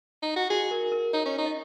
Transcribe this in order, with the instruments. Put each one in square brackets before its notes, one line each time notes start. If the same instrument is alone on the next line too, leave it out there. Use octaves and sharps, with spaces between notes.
[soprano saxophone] D#4
F#4
[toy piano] F#4 [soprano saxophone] G#4
[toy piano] A#4
A#4
[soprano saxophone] D#4 [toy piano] C#5
[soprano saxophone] C#4
D#4
[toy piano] D#5